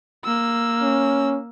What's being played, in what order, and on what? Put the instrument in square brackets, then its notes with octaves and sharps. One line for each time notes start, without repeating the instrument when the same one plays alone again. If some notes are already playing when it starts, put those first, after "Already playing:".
[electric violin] A#3 E6
[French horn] C#4